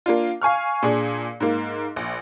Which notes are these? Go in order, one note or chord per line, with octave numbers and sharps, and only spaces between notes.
A#3 D4 F4
F5 G#5 C#6 F6
A#2 D4 G#4
G#2 A#3
A#1